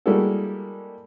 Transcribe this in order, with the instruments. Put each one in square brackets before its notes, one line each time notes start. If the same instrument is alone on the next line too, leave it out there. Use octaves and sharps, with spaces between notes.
[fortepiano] G3 G#3 A#3 E4 F#4 A4